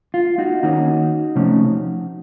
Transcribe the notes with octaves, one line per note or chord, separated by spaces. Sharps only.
F4
D#4 F#4
D#3 A#3 C#4 D#4 F#4
C3 F3 A3 C#4